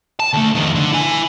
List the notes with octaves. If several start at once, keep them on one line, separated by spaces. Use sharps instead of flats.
A5
D2 A3
F2 D#3
D3
E4 G#5